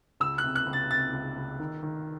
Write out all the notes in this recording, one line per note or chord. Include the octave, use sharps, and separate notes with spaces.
C#2 E6
F#6
C3
F#6
C#2
A6
C3 A6
C#2
C#2
D#3
D#3